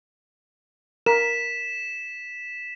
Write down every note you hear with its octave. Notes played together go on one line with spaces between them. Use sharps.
A#4 B6 E7